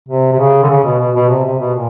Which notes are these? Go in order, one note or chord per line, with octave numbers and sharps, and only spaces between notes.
C3
C3
C#3
D3
C#3
B2
B2
B2
C3
C3
B2
A#2